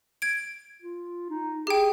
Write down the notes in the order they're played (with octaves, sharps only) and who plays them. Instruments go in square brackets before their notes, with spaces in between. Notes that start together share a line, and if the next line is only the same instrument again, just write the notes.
[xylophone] G#6 D7
[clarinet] F4
D#4
[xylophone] G4 G5 [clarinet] G#4